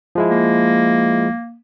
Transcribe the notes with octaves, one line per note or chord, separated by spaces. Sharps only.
F3 G#3 E4
A#3